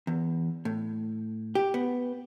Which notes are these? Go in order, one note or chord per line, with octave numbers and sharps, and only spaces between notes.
E2
A2
G4
B3